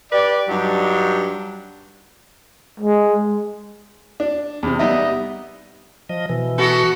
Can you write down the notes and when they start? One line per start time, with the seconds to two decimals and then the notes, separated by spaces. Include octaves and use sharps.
0.11 G4 B4 D5
0.48 G2 F#3 D4 D#4
2.80 G#3
4.20 D4
4.63 E2 C3
4.79 G3 B3 D#4 D#5 E5
6.09 F3 D#5
6.29 B2 E3
6.58 B3 F#4 A4